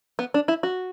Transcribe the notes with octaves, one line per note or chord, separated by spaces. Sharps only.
B3
D4
E4
F#4